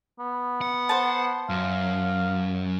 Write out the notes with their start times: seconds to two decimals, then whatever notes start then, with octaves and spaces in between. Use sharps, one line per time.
0.19 B3
0.61 F#5
0.89 C5 A5
1.49 F#2 F5